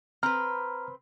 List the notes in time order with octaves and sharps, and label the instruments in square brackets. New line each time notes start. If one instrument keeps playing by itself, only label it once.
[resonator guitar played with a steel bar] C4 B4 [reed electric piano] A#5 F6